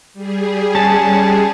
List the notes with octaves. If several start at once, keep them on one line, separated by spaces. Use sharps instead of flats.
G3 G#4
C#4 A5